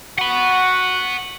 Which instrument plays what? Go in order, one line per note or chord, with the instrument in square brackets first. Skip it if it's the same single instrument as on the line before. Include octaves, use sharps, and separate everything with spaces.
[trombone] F#4 [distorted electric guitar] F#5 B5